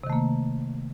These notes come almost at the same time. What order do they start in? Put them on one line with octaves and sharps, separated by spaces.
C3 D#3 A3 A#3